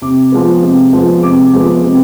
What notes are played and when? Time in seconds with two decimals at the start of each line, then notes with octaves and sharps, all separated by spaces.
0.02 C3 D6
0.32 F3 G#3 B3
0.62 C3
0.93 F3 G#3 B3
1.23 C3 D6
1.53 F3 G#3 B3
1.84 C3